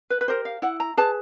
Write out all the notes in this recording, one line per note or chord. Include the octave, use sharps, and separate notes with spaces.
B4
B4
G4 A#4 C5
F5
E4 F#5
A#5
G#4 B4 A5